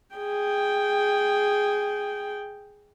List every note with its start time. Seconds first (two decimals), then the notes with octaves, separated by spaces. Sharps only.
0.16 G#4 G5